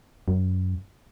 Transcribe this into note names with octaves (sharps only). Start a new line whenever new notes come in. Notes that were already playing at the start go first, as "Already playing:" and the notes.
F#2